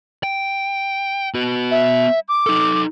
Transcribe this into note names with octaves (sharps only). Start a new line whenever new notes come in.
G5
B3 F#4
E5
D6
D#4 A4